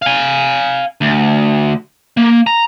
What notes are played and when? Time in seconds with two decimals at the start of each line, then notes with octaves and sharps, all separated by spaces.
0.02 F5 G#5
1.01 D2
2.17 A#3
2.47 A#5